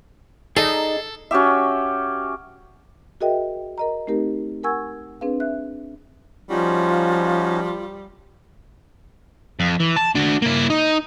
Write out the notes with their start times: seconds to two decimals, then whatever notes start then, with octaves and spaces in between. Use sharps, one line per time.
0.57 D#4 G#4 A4 D5 D#5
1.31 C#4 F#4 G4 E5
3.21 F#4 G#4 A#4 D#5 E5 G5
3.78 A#4 D#5 A#5
4.07 A3 C4 D#4 G4 A#4
4.63 A#4 F#5 G#5 C#6 E6 G#6
5.21 C4 D4 G#4 B4 F5
5.40 E5 F#6
6.49 F3 G3 C#4 D#4 F4 F#4
9.60 F2
9.80 E3
9.96 A5
10.15 D4 F#4
10.42 A#3 E4
10.70 D#4